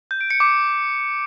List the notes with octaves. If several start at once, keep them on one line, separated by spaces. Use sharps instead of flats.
G6
D7
C#7
D6